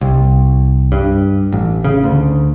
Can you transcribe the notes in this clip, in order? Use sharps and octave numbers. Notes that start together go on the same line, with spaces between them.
C2
G2
A1
C#3
D2